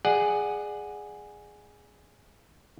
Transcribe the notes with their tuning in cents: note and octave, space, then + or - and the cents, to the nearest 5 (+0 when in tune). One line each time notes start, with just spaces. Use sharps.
G#4 +0 D5 +30 F#5 +0